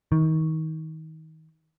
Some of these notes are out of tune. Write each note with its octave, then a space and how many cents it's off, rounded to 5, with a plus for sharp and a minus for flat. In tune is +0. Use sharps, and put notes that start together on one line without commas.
D#3 +30